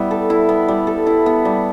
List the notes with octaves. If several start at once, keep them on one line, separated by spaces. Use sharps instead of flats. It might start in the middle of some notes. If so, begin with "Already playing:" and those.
Already playing: G3 B3 E4
A4
E4
B3
G3
A4
E4
B3
G3